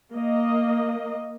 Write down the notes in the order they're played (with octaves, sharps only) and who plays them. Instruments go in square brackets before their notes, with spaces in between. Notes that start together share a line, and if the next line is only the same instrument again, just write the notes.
[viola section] A#3 D#5